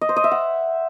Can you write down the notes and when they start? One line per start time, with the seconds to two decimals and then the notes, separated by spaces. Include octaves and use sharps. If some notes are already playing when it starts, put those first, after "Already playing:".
0.01 D#5
0.09 C5
0.16 D#5
0.24 E5
0.31 F#5